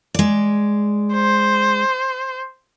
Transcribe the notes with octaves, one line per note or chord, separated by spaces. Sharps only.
G#3 D5
C5